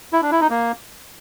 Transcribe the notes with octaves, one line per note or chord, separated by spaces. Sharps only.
E4
D4
E4
D#4
A#3